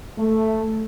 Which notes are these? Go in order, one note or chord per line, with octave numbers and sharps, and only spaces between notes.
A3